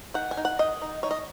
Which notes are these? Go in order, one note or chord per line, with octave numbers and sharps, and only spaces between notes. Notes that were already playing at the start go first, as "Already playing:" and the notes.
D#3 F#5
G#5
D#4
F#5
D#3 D#5
D#4
D#4 C#5
D#5